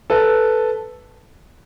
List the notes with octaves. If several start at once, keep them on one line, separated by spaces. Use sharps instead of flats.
A4 B4